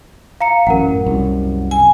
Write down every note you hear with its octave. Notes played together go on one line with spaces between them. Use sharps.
F5 A#5 C#7
A1 F#2 A#4 F#5
C2 F#2
G#5